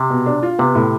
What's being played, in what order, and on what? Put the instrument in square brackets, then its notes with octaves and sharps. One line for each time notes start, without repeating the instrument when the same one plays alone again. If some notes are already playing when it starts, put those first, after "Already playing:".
Already playing: [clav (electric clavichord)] C3
[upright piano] B2
D4
F4
[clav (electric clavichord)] C3 [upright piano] B3
[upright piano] A2